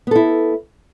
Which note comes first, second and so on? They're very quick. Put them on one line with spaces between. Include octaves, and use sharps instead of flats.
B3 A4 E4